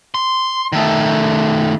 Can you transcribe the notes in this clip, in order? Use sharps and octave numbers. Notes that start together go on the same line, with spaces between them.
C6
D#3 A3